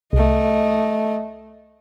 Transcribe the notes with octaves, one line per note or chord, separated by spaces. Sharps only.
C2 A3 D#5